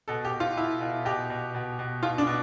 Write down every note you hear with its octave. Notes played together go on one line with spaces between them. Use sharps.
B2 A4
G4
B2
F4
B2 E4
B2
B2 G4
B2
B2
B2
B2 F4
D4
B2